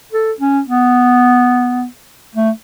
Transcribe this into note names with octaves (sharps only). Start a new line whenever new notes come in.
A4
C#4
B3
A3